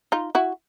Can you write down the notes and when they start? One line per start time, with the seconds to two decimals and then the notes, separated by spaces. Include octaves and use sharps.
0.12 D#4 F4
0.35 E4 F#4